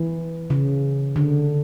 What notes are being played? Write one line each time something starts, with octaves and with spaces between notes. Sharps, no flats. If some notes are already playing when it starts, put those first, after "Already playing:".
Already playing: E3
C#3
D3